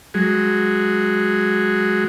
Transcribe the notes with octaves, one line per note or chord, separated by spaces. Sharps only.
F#3 G#3